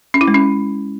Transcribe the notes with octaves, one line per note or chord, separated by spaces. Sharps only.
C#4
E4
G#3
C#4